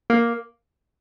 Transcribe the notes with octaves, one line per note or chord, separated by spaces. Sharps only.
A#3